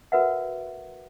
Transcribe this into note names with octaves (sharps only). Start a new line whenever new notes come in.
F#4 A#4 B4 E5 F#5